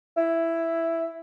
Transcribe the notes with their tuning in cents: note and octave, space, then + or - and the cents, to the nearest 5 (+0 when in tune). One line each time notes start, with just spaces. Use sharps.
E4 +5